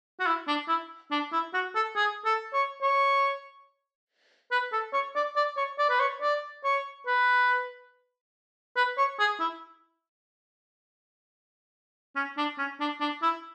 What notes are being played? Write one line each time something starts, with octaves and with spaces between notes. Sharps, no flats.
F#4
E4
D4
E4
D4
E4
F#4
A4
G#4
A4
C#5
C#5
B4
A4
C#5
D5
D5
C#5
D5
B4
C#5
D5
C#5
B4
B4
C#5
G#4
E4
C#4
D4
C#4
D4
D4
E4